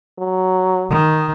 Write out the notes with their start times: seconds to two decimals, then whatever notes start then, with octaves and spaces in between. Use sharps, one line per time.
0.19 F#3
0.90 D#3